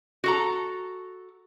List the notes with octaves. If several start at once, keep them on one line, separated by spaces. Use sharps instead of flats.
F#4 A4 A#5